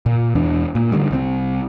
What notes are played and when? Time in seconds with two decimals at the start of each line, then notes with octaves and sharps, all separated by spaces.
0.06 A#2
0.35 E1 E2 E3 D4
0.75 A#2
0.92 D3 D#3 G3 A3
1.11 C2 E3 C4